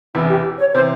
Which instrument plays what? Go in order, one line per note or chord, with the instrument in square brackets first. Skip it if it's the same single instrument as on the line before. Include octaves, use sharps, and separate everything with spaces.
[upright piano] E1 E2 C3 E3 [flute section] E4
[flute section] G4
C#5
[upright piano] C3 E3 [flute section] C5